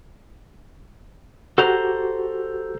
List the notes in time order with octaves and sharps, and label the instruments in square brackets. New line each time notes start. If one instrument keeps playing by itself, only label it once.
[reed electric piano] F#4 G4 [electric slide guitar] A4 C5 A#5